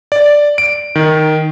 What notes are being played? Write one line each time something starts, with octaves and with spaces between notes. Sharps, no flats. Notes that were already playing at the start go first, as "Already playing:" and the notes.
D5
D7
D#3